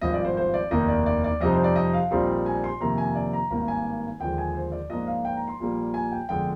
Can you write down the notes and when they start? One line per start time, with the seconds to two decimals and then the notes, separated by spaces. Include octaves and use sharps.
0.01 G#1 G2 F3 D#5
0.14 D5
0.25 C5
0.37 C5
0.54 D5
0.71 F1 D#2 D#3 A#3 D4 D#5
0.88 D5
1.06 D5
1.24 D5
1.41 F2 C3 G3 C4 D#4 D#5
1.53 C5
1.64 D5
1.76 D#5
1.93 F5
2.11 A#1 A#2 G3 C4 D#4 C6
2.46 G#5
2.64 C6
2.80 F2 C3 D#3 A#3 A#5
2.98 G#5
3.15 D5
3.33 A#5
3.50 G#1 G2 D#3 A#3 A#5
3.68 G#5
4.20 D#2 D3 F3 G#3 G5
4.38 G#5
4.55 C5
4.72 D5
4.89 G#2 F3 A#3 D4 F4 D#5
5.07 F5
5.25 G5
5.37 A#5
5.48 C6
5.60 A#1 A#2 G3 A#3
5.94 G#5
6.12 G5
6.29 G1 F2 D3 G#3 G5